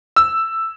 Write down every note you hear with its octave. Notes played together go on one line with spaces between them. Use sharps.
E6